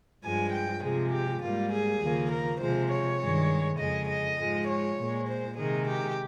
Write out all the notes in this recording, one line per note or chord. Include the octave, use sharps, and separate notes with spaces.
G2 F3 G#3 G#5
G5
C3 F3 G#3 G#4
G4
G#2 G3 A#3 F4
G#4
D#2 C#3 F3 A#3
A#4
C3 F3 G#3 C5
C#5
G2 D#3 G#3
F2 C#3 G#3 D#5
D#5
G#2 F3 G#3
C#5
A#2 G#3
C5
C3 D#3 G#3 G#4
G4